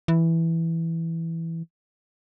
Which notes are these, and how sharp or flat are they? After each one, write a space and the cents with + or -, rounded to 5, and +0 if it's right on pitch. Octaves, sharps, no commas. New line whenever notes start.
E3 +0